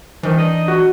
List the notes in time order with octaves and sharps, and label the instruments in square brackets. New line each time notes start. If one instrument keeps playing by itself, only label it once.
[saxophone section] G2 C3 D#3 [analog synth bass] E3
[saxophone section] D4 D#4 D#5
[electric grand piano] F#4